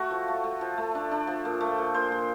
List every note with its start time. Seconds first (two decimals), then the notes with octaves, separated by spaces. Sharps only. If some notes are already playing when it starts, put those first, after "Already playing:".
Already playing: A3 F#4
0.11 F3
0.28 A3
0.44 A3
0.61 F3
0.78 A3
0.95 D4
1.11 D4
1.27 F3
1.45 A#2
1.61 A3
1.78 A#2
1.94 A#2 C5
2.12 A#2